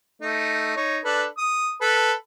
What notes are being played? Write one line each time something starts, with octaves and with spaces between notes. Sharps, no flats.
A3 D#4
D#4 C#5
D4 A4 B4
D#6
A4 B4